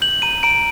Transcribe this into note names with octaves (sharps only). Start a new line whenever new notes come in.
G6 F#7
A#5 D#7
A#5 D7